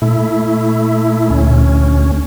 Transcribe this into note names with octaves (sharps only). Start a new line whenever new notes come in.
A#2 A3 E4
D2 C#4